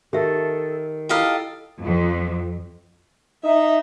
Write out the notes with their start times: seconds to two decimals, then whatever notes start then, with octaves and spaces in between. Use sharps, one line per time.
0.13 D#3 G4 A4 E5
1.09 E4 F4 G4 A4 D#5 F5
1.83 F2
3.44 D#4 E5